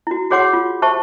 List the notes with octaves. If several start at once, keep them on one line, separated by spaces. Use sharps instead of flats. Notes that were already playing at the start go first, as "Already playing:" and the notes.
E4 F#4
F#4 G#4 C#5 F#5 C6 D6
F4
G4 C5 E5 A5 C#6